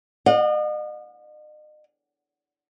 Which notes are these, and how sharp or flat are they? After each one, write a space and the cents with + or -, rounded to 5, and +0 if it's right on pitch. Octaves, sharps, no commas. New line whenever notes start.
D#5 -40 F#5 -45